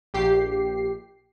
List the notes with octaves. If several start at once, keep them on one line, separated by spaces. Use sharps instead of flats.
A#1 G4 C7